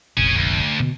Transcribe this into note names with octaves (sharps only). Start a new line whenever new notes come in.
F1 A#1 C#4 G#4
D2
B2